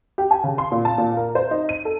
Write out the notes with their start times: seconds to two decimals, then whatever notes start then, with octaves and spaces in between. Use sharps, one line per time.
0.18 G4
0.31 G#5
0.44 C#3
0.58 C6
0.72 A#2
0.85 A5
0.98 A#2
1.17 A#4
1.35 C5
1.51 D#4
1.69 D#7
1.85 A4